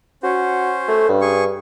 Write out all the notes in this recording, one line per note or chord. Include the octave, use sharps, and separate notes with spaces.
C#4 F#4 C5
A3
G2
G#4 C#6